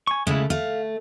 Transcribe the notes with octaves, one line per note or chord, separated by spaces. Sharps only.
G#5 C#6
C#3 G#3 A3 E4
A3 F5